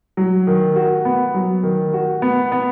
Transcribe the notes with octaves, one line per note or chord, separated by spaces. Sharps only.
F#3
D#3
F#4
B3
F#3
D#3
F#4
B3
B3